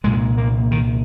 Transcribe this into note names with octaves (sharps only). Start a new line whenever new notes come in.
C2 A#2 G#3
A#3
D#3